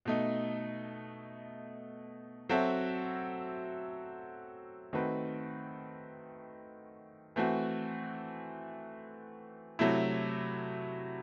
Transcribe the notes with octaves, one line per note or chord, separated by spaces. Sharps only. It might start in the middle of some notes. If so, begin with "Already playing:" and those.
B2 A3 D#4
F#3 C4 F#4 A4 E5
D#3 A3 C4 F#4 B4
E3 A3 C4 F#4
C3 F#3 A3 E4